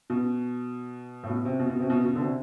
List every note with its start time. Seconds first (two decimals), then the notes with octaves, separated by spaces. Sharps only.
0.10 B2
1.23 A2
1.29 B2
1.45 C3
1.59 B2
1.69 B2
1.80 C3
1.90 B2
2.05 B2
2.16 D3
2.21 C3